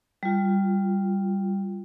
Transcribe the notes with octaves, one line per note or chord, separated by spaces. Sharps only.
G3 F4